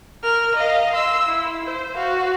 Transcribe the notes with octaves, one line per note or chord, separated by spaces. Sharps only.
A#4 F6
D#5 F5
C6 E6
E4
C5
F#4 F5